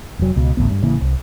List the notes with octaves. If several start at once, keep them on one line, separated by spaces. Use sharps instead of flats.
F1 F#3
C#2 B2
A1 D2 B3
G2
A1 C#3 E3 A#3
C2